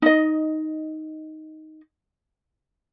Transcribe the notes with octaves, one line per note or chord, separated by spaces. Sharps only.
D#4 D#5